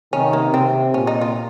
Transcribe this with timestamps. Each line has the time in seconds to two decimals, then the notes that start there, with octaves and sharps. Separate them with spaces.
0.13 C3 D#3 C#4
0.33 A#3
0.53 C3 C4
0.94 A#2 C#4
1.07 D#4
1.21 F4